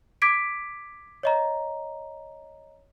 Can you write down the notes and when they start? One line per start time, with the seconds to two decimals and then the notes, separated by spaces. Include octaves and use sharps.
0.22 D6 G#6 B6 D7
1.23 C#5 D#5 A#5